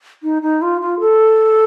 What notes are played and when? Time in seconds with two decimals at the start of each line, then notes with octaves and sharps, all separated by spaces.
0.23 D#4
0.42 D#4
0.62 F4
0.81 F4
1.00 A4